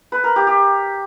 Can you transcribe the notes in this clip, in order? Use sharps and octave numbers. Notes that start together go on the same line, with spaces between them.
B4
A#4
G4
G4